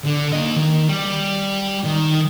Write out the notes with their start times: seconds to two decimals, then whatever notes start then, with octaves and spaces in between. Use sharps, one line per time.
0.04 D3
0.32 A#3 D#5
0.56 D#3
0.89 G3
1.85 D#3